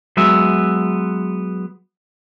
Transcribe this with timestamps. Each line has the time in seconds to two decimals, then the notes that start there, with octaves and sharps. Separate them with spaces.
0.17 F#3 G#3 B3 E5